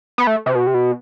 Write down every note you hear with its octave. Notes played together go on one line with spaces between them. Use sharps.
B3
A3
C3
B2
C3
B2